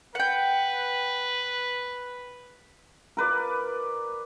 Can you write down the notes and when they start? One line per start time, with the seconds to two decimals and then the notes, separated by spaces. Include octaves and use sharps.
0.15 B4 F#5 G5
3.17 A#4 B4 D5